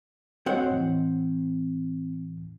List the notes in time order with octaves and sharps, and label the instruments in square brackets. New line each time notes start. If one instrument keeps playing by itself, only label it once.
[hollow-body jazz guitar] C4 C5 F#5 [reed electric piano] F#4 C#5 D#5
[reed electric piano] A2 E3